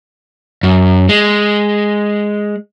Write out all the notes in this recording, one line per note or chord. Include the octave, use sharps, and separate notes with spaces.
F#2
G#3